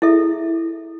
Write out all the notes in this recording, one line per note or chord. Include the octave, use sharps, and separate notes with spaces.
E4 G#4 A4 E5